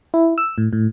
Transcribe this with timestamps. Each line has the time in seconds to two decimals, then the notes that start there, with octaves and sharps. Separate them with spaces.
0.14 E4
0.38 E6
0.58 A2
0.73 A2